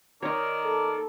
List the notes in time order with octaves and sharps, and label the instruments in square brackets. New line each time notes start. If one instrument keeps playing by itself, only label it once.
[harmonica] D#3 A#4 D5 [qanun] D#4 C#5
[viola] A4